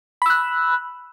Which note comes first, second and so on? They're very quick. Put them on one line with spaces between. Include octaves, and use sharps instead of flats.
B5 E6 F#6